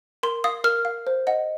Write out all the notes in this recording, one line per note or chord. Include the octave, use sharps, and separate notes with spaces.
A#4 C6
F5 D#6
A#4 F6
F5
C5
D#5 F#5